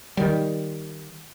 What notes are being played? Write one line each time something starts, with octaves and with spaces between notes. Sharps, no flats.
D#3 G3